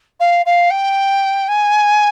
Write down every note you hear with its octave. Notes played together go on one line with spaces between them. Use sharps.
F5
F5
G5
G#5